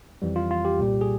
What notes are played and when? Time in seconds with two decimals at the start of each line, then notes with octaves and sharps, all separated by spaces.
0.22 F2 E3 G3
0.36 F4
0.51 F4
0.65 G4
0.78 C2 A#2 G3
1.01 G#4